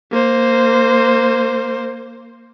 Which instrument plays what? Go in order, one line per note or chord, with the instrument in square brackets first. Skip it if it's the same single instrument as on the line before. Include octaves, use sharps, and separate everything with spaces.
[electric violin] A#3 C5